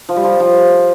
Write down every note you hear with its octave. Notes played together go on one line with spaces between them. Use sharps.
F3
G3
F3
F3